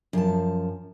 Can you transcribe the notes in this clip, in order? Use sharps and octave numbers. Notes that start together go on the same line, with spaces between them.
F#2 F3 F#4 A5